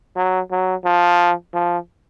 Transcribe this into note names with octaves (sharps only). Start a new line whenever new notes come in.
F#3
F#3
F3
F3